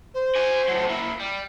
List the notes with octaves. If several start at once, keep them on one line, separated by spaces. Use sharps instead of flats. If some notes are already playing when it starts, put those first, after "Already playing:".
C5
F#4 G#5
A2 F#3
A#3 E4 B5
G3